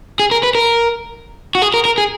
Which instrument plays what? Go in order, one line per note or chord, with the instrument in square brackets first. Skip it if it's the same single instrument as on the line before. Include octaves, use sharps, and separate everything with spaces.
[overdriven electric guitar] G#4
A#4
B4
A#4
F#4
G#4
A#4
A#4
G#4